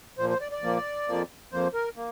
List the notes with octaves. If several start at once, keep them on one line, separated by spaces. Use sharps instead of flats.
A#2 F3 A#3 C5
C5
D5
D5
A#2 F3 A#3
F2 F3 A#3
F2 F3 A#3 C5
A#4
A#3